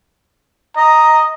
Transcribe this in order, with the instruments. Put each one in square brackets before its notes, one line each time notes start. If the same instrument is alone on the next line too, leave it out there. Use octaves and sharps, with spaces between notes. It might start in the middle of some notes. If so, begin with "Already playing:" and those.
[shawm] D#5 [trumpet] A#5